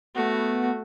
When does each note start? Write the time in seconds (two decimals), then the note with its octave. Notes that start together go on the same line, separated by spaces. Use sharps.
0.15 A3 B3 F#4